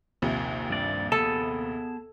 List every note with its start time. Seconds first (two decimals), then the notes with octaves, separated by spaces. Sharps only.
0.22 A#1 D#2 C3
0.70 G2 D5
1.12 B3 G#4 A4 A5